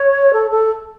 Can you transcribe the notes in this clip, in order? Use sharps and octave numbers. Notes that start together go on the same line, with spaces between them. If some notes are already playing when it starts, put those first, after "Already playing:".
Already playing: C#5
A4
A4